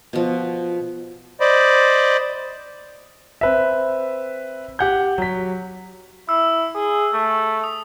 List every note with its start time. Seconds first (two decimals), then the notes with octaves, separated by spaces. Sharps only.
0.13 B2 F3
1.40 C5 D5 D#5 B5
3.41 C4 B4 E5
4.79 G4 F#5 G6
5.18 F#3 B6
6.29 E4 E6
6.75 G#4
7.13 A3
7.64 D#6